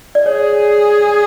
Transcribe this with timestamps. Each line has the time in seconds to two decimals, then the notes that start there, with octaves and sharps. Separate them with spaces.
0.15 D5
0.26 G#4 C#5